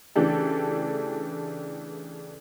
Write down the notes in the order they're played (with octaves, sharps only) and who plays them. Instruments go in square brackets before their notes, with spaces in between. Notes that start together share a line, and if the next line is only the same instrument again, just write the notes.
[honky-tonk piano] C#3 E3 A3 D4 G4 A4